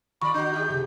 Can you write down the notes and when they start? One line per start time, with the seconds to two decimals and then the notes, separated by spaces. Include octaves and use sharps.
0.22 D#3 F4 D5 A#5 B5 C#6 D6
0.34 D4 F#4 G6
0.53 D#4 G4 G#4 E5
0.68 F#1 C#2 C3